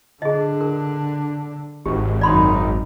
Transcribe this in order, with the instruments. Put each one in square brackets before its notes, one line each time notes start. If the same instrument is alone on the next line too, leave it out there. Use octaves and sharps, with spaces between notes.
[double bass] D3 D4 [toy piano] G#4 D#5
[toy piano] A#4
[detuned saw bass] G#1 [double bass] G#2 [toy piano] G4
[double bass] F#2 D#4 [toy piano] D5 B5 C6